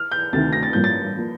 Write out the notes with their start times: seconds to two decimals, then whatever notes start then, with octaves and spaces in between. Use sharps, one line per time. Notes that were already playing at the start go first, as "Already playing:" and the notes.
Already playing: F6
0.11 G6
0.33 D2 C3 D#3 A3 A6
0.53 A#6
0.63 A6
0.73 A1 G2 F3 A#3 G6
0.84 A6
1.16 F3 A#3